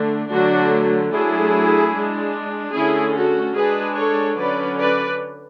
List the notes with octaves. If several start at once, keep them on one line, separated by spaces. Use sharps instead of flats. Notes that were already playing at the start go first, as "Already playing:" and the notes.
Already playing: D3 A3 D4
D3 F#3 A3 D4 F#4
F#3 A3 D4 E4 G#4
G#3 D4
D3 A3 C#4 E4 G#4
F#4 A4
G#3 D4 G#4 B4
A4 C#5
D3 F#3 C#4 B4 D5
B4 D5